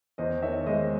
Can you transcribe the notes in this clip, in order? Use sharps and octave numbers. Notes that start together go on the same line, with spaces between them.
E2 C5 D#5
D#3 C#5 E5
G#3 C5 D#5